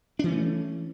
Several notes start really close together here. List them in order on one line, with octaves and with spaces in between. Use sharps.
D4 E3 C#4 A3